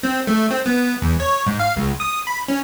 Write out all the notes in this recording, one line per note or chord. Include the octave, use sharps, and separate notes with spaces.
C4
A3
C4
B3
E2
C#5
G#2
F5
C#2
D#6
B5
C#4